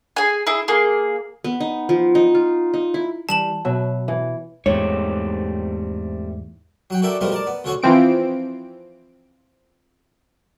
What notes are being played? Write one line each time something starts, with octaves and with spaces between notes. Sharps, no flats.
G#4 G#5
E4 G#4 E5
A#3 G#4
B3
D#4
F3
D#4
F4
D#4
E4
E3 G3 A5 E7 F#7
B2 F#3 B4 E5
E3
E2 G#2 G3 A3 C4 C#5
F#3 F#5 G5
F#4 A4 A#4 D5 E5 G5
B2 F3 G3 A3 B3 A#4
A#4 D5 A5
B3
D2 D3 C#4 F#4 G#4 C#5
E3 F3 C4 D7